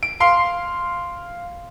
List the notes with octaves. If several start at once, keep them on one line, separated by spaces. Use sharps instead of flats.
D7
F5 C6 C7